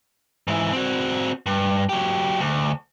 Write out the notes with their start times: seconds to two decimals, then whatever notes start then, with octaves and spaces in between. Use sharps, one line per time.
0.48 G#2 E3
0.72 C4 F#4
1.46 G2
1.89 F#3 G4
2.40 D2